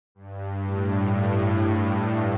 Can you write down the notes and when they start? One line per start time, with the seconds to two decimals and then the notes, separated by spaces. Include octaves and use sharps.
0.15 G2
0.63 A2